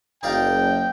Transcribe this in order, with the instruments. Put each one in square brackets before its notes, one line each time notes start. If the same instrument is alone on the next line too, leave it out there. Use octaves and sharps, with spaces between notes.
[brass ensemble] F#1 [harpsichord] D#4 D5 F5 [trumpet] G5